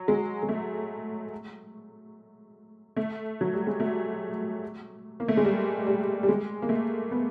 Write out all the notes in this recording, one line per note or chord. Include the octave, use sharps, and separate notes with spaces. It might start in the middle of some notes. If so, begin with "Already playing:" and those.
Already playing: F#3
G#3
G#3
A3
A3
F#3
G3
G#3
A3
A#3
A3
G#3
G3
G3
G3
G#3
A#3
A3
B3